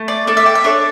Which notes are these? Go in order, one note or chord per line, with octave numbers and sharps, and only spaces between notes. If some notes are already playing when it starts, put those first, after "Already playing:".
Already playing: A3
D5
D4 A4 D5
E5
G5
E5
D4 A4 C#5